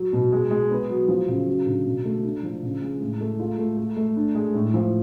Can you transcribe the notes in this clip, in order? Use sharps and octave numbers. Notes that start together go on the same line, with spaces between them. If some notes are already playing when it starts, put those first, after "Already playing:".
Already playing: F#3
B2
G#3
G#3
B3
F#3
F3
C#3
F#3
D3
B2
A3
D4
F3
C#3
G#3
A2
A3
F4
A3
A3
A3
D4
G#3
A2
F3